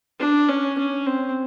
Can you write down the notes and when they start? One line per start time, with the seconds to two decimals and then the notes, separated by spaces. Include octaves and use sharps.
0.20 D4
0.49 C#4
0.78 C#4
1.06 C4